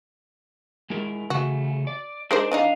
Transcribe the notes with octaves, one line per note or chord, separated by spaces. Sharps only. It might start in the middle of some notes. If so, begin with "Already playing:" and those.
G#3 E4 A#4
C#3 A3 F#4
D5
G#3 D4 D#4 A#4 C5 D5
E3 D4 D#4 D#5 F5